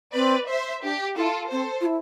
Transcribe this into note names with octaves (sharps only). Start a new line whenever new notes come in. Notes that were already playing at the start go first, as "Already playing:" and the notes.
C4 B4 D5
C5 E5
D4 G4
E4 F4 A4
C4 A4 C5
F4
E4